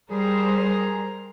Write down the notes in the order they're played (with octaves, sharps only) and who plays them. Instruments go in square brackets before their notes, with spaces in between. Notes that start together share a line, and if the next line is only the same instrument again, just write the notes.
[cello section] G3 C5 [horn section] G#4 [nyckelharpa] A#4 A#5